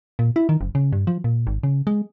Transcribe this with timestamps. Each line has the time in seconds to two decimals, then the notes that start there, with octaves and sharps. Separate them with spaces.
0.19 A#2
0.36 E4
0.49 D#3
0.61 F#1
0.75 C#3
0.93 G2
1.07 F3
1.24 A#2
1.47 G#1
1.63 C#3
1.87 G#3